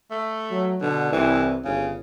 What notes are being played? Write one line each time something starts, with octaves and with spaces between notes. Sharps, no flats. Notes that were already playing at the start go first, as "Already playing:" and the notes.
A3
F#3
B2 D3
C2 E3
G1 C#3